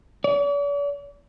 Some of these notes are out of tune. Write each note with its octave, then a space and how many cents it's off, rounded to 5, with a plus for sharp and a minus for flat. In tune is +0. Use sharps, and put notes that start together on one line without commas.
D5 -45